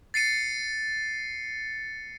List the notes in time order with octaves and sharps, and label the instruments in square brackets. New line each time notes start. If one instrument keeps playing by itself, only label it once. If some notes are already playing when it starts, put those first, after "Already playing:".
[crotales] A6 C7 C#7 D#7